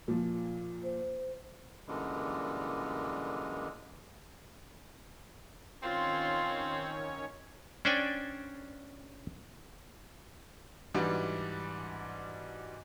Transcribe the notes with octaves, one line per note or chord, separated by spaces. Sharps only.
A#2 F3
C5
F#2 A#2 D3 E3 G3 G#3
D#3 C4 C#4 F4 C#5
C#4 D4 C5 D5 G5 G#5
G#2 E3 G3 D4 F#4